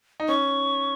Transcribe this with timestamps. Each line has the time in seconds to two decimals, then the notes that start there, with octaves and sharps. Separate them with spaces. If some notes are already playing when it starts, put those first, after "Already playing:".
0.20 D#4
0.28 C#4 C#6